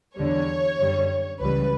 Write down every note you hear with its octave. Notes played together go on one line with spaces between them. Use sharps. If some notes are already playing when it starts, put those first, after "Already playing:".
E2 D3 G3 C#5
F#2 D3 G3
C#2 C#3 E3 G3 B4